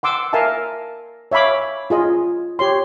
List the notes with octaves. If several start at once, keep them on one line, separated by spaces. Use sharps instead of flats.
F#5 C6 D6 E6
A#4 E5 F5 G#5 A5
C#5 E5 F5 B5 D6
F4 G#4 D#5
G4 C#5 C6